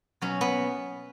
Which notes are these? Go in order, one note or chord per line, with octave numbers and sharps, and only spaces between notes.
B2 F#3 C#4
B3